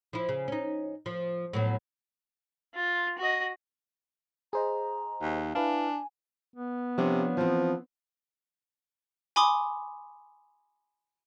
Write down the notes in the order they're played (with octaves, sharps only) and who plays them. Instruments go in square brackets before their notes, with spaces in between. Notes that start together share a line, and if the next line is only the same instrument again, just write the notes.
[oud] F3 E4
C#3
C#4 D#4
F3
A2 F#3 B3
[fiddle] F4
F#4 D#5
[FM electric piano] G#4 C5 D#5 [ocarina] A#5
[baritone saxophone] D#2
[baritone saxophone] D4 [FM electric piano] E4 B4 F5 [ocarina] G#5
[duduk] B3
[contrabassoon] C3 [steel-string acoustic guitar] F3 D4 C#5
[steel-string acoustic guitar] E3 C4 [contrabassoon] F3
[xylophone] G#5 B5 C6 D6 D#6